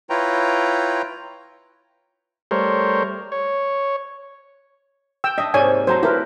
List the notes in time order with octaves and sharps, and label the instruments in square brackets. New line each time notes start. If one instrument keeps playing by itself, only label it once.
[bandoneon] E4 F4 B4 C#5 G5 A#5
[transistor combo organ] G3 A3 A#4 C5 C#5
C#5
[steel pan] G5 E6
[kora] D4 E5 [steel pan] D#5
[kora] G#2 C3 A#3 [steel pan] C#5 D5 G#5
[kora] F#3 A3 C4 [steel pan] C5 A#5
[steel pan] E4 A#4 B4 [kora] G4